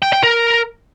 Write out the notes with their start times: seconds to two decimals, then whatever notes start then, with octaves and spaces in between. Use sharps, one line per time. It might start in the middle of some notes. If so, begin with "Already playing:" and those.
0.02 G5
0.13 G5
0.23 A#4